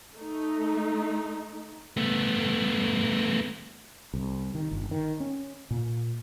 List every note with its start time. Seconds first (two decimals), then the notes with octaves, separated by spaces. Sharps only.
0.16 A3 D#4
1.97 A3 B3
4.14 C2
4.55 D#3
4.71 G1
4.91 D#3
5.20 C#4
5.71 A#2